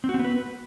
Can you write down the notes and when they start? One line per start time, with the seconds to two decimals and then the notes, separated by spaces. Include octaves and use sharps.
0.04 C4
0.09 F#4
0.14 C4
0.19 B3
0.25 B4